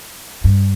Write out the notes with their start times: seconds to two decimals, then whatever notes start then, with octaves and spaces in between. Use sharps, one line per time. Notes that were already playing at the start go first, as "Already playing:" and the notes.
0.44 G2